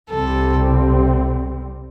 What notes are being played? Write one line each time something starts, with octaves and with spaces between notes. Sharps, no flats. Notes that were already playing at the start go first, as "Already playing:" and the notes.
C2 C3 G3 C4 A4